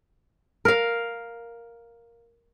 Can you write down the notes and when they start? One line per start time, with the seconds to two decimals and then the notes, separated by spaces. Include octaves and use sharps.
0.65 A#4 F5